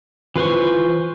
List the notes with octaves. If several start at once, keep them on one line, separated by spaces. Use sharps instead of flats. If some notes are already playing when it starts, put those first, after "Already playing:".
E3 F4 B4 C5 C#6